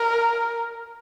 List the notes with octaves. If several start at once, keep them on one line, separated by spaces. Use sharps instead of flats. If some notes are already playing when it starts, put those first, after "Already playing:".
Already playing: A#4